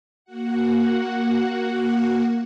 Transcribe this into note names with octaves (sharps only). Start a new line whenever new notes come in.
A#3 F#4 F#5